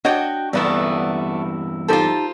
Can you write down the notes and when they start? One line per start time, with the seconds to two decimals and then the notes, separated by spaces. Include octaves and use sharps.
0.05 D4 F#4 C#5 D#5 G5
0.53 E2 G2 A3 B3 E4 D5
1.88 D#4 F4 G4 A4 C5